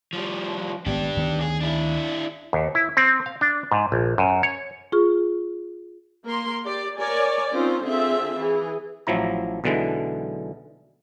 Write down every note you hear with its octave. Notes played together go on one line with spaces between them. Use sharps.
F3 G3
G#1 B2 B3 D4 G4
D2 D#3 B3
G#4
D4 E4
D#2
E4
C4
F5
D4
G#2
A#1
F#2
C#5
F4 G#4 C#6 F6
A#3 A#4 C6
G4 D5
A#4 C#5 D5 G#5
C4 C#4 D#4 F4 C5
D3 C4 F4 G#4 E5
E3 G#4
A1 F3 F#3 E4 A#5
B1 B2 D3 E3 G#3